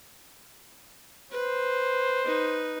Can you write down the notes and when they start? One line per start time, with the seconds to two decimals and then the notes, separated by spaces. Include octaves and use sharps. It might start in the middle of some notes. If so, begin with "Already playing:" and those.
1.31 B4 C5
2.25 D#4 B4